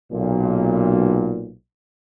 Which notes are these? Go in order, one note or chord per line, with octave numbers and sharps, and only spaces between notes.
B1 A#2